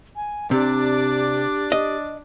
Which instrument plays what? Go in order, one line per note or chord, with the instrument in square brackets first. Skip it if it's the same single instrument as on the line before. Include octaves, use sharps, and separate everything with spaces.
[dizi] G#5
[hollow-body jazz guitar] C3 [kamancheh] D4 D5 [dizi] G4
[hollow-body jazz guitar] D#5